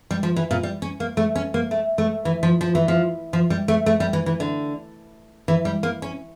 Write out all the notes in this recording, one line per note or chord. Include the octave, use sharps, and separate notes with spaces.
G3
F3
E3
A#2
G3
C#4
A#3
A3
C#4
A#3
A3
A3
E3
F3
F3
E3
F3
F3
G3
A3
A3
G3
E3
E3
D3
E3
G3
A#3
C#4